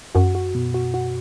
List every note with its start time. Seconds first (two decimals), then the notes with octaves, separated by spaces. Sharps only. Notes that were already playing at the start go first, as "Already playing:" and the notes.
0.15 F#2 F#4
0.35 F#4
0.55 B2
0.74 F#4
0.94 F#4